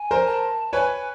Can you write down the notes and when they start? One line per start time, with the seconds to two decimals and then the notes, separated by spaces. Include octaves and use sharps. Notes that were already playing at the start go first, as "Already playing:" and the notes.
Already playing: G#5
0.11 A#4 C5
0.26 A5
0.73 B4 C#5 G#5